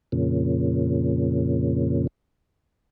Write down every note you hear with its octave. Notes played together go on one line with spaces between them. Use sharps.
F2 A#2 C#3